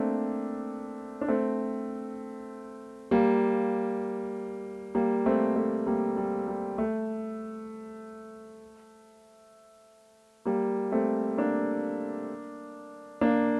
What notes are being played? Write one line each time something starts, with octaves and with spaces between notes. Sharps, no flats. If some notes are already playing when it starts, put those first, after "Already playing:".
Already playing: A3 A#3 C4 D4
D4
A3 C4
G3 A#3
G3 A#3
A3 C4
A3
G3 A#3
G3
G3
A3
G3 A#3
A3 C4
A#3 D4
A#3 D4